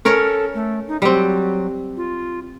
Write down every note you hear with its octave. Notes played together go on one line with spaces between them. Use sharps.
C#4 A4 A#4 C#5
A3
D#4
F#3 G3 C4
F4